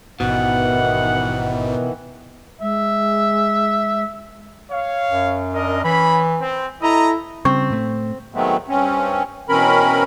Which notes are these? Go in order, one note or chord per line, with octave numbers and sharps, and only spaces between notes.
A1 G#2 B2 D#3 E3 B3 F#5
G#3 E5
C#5 F5
F#2
D4 A#4 D#5
E3 C#4 B5
C4
E4 A4 D#5 A#5
C#3 G3 C4 C#6
A2 A3
D#3 F#3 G#3 A3 B3 C4
G2 C4 C#4
B2 E3 C4 C#4 A#4 B5